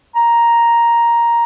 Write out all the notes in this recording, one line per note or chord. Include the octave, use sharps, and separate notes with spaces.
A#5